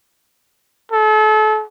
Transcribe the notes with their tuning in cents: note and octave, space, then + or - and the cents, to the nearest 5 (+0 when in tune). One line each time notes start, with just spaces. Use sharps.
A4 -35